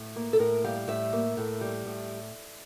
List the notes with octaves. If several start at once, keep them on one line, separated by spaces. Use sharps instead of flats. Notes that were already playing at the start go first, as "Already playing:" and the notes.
Already playing: A2
A#3
A4
A2 A#4
G3 F5
A2 E5
A#3
A2
G3
A2